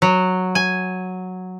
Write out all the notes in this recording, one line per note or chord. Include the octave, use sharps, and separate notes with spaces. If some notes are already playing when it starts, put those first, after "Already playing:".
F#3
G#5